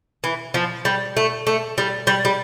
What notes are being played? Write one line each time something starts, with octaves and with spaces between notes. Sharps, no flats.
E3
F3
G3
A3
A3
G3
G3
G3